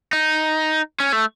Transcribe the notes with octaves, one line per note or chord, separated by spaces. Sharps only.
D#4
C#4
A3